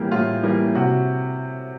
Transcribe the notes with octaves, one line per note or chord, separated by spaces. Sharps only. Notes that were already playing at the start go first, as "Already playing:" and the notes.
Already playing: A2 E3 G3 A#3
A2 F4
E3 G3 A#3
C3 F#4